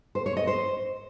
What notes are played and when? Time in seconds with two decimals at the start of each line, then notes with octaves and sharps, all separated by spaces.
0.15 C5
0.26 C#5
0.37 D#5
0.47 C5